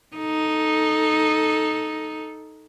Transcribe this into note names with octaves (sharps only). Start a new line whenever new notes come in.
D#4 A4